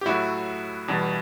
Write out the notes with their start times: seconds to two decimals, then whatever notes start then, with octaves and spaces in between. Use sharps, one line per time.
0.01 G4
0.05 A2 F#3 A3 E4 F#4
0.88 E2 B2 G3